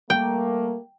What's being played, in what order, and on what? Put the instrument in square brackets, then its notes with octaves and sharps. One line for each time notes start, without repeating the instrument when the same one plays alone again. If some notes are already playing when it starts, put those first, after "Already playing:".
[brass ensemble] G3 A3 A#3 [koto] G5